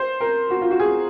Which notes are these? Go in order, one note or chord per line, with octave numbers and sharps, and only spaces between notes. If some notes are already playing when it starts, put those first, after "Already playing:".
Already playing: C5
A#4
F#4
F4
F#4
G#4